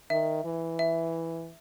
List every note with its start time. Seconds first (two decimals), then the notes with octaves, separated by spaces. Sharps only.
0.10 D#3 E5
0.45 E3
0.79 E5